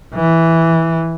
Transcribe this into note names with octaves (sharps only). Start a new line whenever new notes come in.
E3